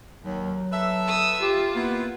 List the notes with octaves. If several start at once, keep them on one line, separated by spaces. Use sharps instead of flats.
D#2 F#3
A4 B4 E5
D#6 E6
F4 G4
A#3 B3 E4